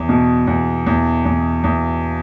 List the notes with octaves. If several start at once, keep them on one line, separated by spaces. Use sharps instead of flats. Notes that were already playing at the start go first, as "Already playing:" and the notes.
Already playing: E2
B2
E2
E2
E2
E2